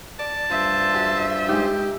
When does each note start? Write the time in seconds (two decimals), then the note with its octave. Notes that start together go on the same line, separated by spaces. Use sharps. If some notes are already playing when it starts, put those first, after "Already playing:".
0.19 D5 A5
0.50 G2 F4 C5 E5
0.94 F#4 G#4 C6
1.48 G#3 D#4 G4